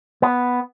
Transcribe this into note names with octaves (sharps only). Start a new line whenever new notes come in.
B3